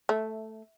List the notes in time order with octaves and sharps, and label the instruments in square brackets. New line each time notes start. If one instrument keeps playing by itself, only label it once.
[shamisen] A3